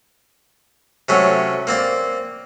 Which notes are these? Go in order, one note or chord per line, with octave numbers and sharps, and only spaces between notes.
C3 F#3 A3 C#4
A#3 C4 D5